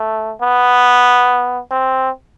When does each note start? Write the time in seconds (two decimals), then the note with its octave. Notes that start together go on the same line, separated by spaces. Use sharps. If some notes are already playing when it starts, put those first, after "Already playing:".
Already playing: A3
0.42 B3
1.71 C4